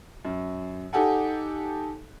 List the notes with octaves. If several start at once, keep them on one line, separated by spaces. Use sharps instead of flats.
F#2
D#4 G4 A4 F#5 G#5